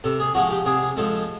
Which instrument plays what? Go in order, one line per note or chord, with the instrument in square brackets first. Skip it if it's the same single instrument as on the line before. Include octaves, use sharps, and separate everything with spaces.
[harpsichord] C3 A4
G#4
F3 G#3 F#4
G4
C3 G#4
F3 G#3 A4